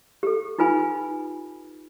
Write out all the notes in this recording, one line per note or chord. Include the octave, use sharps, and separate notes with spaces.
G4 A4
D#4 F4 B4 G#5 B5